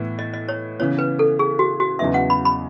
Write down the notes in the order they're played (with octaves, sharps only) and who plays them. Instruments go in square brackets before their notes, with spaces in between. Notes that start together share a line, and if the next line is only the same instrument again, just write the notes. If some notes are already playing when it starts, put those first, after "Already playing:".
Already playing: [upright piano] A2 E3 B3 E4
[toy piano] D#5
D#5
C#5
[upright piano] C#3 E3 B3 [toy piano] C#5
[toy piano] B4
A4
G#4
F#4
F#4
[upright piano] E2 C#3 F#3 B3 D#4 [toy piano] E5
[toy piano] F#5
B5
B5